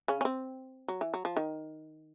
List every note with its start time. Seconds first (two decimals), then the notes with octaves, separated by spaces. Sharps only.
0.08 C#3 C#4
0.21 C#4
0.25 C4
0.88 F#3
1.01 E3
1.14 F#3
1.25 F3
1.37 D#3